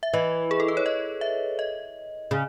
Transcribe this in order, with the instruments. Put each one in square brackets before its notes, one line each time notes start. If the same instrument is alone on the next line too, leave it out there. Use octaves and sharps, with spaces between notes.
[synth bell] E5
[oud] E3 [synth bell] D#5
[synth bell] G#4
A4
B4
C#5
D#5
E5
D#5
[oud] C#3